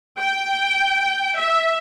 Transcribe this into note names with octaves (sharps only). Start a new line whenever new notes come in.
G5
E5